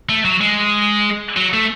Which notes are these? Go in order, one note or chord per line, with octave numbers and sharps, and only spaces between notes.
A3
F#3
G#3
F#3
A3